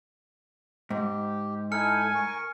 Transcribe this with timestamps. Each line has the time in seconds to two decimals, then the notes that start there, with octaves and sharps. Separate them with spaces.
0.90 G#2 G4
1.72 D#4 E4 A4 G#5 F6 C#7
2.15 A#4 C#6